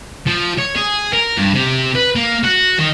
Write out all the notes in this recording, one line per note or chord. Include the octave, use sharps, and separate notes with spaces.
F3
C#5
G#4
A#4
G2
C3
B4
A#3
F#4
D#3